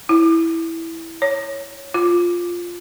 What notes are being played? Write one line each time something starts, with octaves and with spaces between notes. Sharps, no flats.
E4
C#5
F4